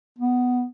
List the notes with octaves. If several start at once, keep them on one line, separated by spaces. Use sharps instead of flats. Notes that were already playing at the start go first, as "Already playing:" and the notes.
B3